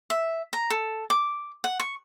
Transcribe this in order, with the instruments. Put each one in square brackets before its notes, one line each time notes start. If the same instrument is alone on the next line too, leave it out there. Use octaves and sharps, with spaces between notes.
[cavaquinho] E5
A#5
A4
D6
F#5
C#6